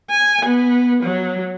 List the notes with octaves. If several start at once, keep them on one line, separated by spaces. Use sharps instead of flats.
G#5
B3
F#3